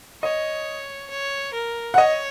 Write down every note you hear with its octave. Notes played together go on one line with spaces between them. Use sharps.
C#5 D#5
C#5
A#4
F#5
C#5 D#5